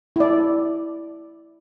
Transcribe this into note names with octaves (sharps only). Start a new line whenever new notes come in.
E4 D5